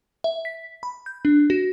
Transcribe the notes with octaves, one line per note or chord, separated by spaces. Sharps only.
E5
B6
B5
G6
D4
F#4